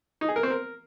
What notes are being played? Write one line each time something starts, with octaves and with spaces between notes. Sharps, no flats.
D#4
G#4
A#4
C4
A#4